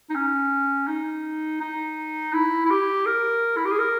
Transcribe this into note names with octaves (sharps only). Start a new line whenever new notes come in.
D#4
C#4
D#4
D#4
E4
E4
G4
A#4
E4
G4
G#4
A#4